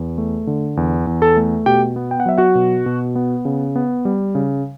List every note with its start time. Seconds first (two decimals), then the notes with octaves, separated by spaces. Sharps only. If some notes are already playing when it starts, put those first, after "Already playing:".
Already playing: E2
0.18 A3
0.47 D3
0.77 E2
1.07 E2
1.22 A4 A5
1.37 A3
1.66 B2 G4 G5
1.96 B3
2.11 G5
2.20 F#5
2.26 F#3 E5
2.38 F#4 F#5
2.55 B2
2.86 B2
3.15 B3
3.45 C#3
3.76 B3
4.05 G3
4.35 C#3